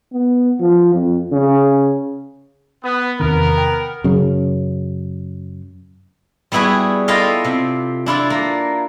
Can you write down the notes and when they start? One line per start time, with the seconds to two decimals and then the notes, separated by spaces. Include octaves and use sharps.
0.13 B3
0.60 F3
0.94 F2
1.32 C#3
2.84 B3
3.20 E2 C3 D#3 B3 A#4
3.58 G5
4.04 F#2 C#3
6.52 G3 B3 E4 F#4 G#4
7.08 E4 F4 G4 A4 D#5 F5
7.45 C3
8.06 D4 E4 F4 D5
8.30 A#3